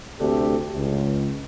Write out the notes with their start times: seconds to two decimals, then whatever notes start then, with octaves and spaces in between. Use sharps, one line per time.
0.20 D2 C3 C4 D4 G4 A4
0.74 C#2